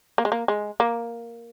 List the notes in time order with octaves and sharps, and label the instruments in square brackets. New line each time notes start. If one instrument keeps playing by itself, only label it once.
[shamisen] A#3
G#3
A#3
G#3
A#3